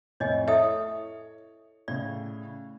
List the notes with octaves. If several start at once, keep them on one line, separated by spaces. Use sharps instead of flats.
F2 A2 C#5 D#5 G#5
E4 A4 C#5 E5 D#6
A2 C#3 D5